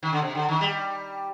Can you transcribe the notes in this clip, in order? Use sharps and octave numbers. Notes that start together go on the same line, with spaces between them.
D#3
D3
C3
D3
D#3
G3